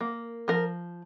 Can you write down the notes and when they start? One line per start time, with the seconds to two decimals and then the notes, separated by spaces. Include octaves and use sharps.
0.01 A#3
0.48 F3 A#4